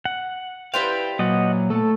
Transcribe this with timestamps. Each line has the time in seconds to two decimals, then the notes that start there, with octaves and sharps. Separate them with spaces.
0.05 F#5
0.74 E4 G4 B4 C5 D5 F5 G5
1.19 A#2 F#3 D#5 F#5
1.70 A3 A4